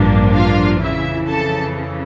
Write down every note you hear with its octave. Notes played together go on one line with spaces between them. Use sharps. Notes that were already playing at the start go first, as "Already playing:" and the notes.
Already playing: A1 G2 F3 A#3 D4
F4 F5
F2 C#3 E3 E4 E5
A4 A5